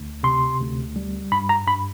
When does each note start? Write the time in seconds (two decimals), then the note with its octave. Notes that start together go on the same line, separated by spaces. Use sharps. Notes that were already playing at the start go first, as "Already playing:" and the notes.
Already playing: D2
0.23 C3 C6
0.60 D2
0.96 G3
1.32 G2 B5
1.49 A#5
1.67 G2 B5